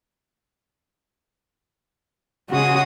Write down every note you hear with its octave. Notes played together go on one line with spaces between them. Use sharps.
C#3 G#3 F#4 D#6